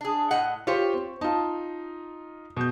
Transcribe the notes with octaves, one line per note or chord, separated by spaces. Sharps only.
D4 G#4
A2 D#5 F#5
F4 G4 C5 C#5
C4
D#4 F4 A5
B2 G6